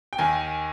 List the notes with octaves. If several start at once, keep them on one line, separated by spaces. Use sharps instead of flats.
G5
D#2 D#3 G#5